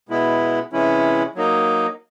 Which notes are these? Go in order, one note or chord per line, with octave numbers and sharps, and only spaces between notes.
B2 G#3 B3 E4
C3 E3 G#3 C#4 E4
F#3 A#3 D#4